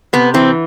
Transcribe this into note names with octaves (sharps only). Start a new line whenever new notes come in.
C3 B3
E3 C4